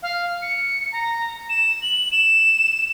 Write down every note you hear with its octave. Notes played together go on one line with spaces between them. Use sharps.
F5
C#7
A#5
E7
F#7
E7